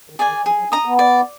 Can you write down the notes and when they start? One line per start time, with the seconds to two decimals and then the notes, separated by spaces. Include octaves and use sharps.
0.10 D#3
0.19 G#4 D5 G#5
0.28 D#3
0.45 F3 G#4
0.59 F#3
0.72 D4 D#5 A#5 D#6
0.86 B3
0.99 D5